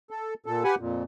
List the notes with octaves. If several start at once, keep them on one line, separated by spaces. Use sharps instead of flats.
A4
A#2 A4
G4 B4 F#5 G#5
F2 A#2